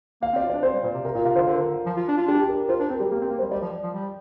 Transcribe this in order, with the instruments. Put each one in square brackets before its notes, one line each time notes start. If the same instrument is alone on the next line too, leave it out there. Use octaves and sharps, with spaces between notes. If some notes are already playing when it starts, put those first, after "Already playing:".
[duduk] A#3 [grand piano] F5
[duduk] C4
[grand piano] D5
[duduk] F4
[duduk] D4 [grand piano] D5
[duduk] C4 [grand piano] C5
[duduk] G3
A#2
C3
[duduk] C3 [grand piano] A#4
[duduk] A#2 [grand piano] F4
[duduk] C3 [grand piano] F5
[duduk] D3 [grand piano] C5
[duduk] D3 [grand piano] A#4
[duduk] F3
F4
D4
F4
[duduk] D4 [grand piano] G4
[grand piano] G4
A#4
[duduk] F4 [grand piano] C5
[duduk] D4 [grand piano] A#4
[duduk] C4 [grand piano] A#4
[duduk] G3 [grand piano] G4
[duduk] A#3 [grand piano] G4
[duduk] C4
[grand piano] A#4
[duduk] A#3
[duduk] G3 [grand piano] C5
[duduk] G3 [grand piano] D5
[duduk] F3
F3
G3